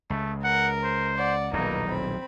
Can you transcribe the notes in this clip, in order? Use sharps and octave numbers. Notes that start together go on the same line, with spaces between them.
C#2 A3
A#4 F#5
C5
D5 F#5
D#1 B1 E2 A#3 D#4 B4
C4 B5